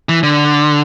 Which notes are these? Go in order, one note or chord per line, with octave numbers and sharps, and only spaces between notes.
E3
D3